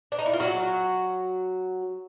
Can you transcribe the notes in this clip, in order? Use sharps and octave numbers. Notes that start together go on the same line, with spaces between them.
D4
D#4
E4
F4
F#3 F#4